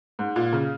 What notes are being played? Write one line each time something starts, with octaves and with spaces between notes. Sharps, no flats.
G#2
A#2
C#3